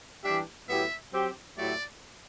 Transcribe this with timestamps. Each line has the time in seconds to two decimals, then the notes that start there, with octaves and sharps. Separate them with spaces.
0.24 E3 G3 D4 G4 E5
0.69 A2 F#3 B3 E4 G4 E5
1.13 F#3 C4 G4
1.57 A2 F#3 A3 E4 G4 D5